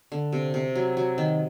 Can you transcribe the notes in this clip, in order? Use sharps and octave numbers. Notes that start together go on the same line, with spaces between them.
D3
C3
C3
F#3
F#3
D#3